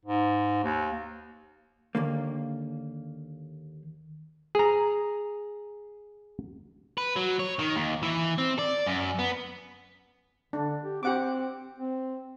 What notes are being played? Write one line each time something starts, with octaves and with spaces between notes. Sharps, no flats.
G#2
D#2
D#2 D3 A#3
G#4 A#5
B4
F#3
C#5
D#3
D#2
E3
C4
D5
F#2
B3
D3 D4
G4
C4 G4 F#5 D6
C4